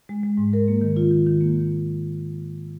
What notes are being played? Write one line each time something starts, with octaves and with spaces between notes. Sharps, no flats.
G#3
G#3
G#2
A#4
A#3
D#3
F4
D#3
D#3
A#3